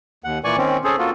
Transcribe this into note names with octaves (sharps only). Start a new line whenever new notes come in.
D#2 F#5
A#2 E3 D5 G#5 C#6
D#3 C4 C#4
C#4 G#4 A4 C5
A#3 F4 F#4 A4